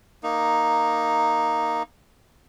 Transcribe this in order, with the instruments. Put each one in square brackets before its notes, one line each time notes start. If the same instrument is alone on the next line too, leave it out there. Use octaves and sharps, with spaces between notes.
[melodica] A#3 D#4